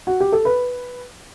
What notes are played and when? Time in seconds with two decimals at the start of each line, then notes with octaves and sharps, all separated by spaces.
0.07 F#4
0.20 G4
0.32 A4
0.45 B4